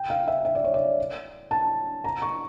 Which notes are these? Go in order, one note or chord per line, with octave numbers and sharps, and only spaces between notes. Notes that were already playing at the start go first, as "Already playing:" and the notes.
Already playing: G5
F5
E5
E5
D5
C#5
D5
A5
A#5
C#6